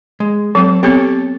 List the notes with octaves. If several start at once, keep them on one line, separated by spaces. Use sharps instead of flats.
G#3
F#3 C4 A4
B3 C4 G4 A4 C#5